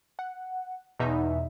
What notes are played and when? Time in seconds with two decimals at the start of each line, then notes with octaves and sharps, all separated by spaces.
0.19 F#5
0.99 E2 B2 D#4 E5